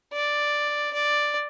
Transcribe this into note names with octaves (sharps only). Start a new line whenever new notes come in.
D5
D5